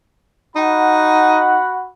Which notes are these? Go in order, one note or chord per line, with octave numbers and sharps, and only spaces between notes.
D#4 F#4 F#5 B5